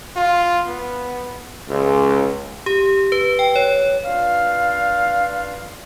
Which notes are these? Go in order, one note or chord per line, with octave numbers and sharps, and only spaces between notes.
F4
B3
C#2
G4
B4
G5
C#5
D4 F4 B4 F5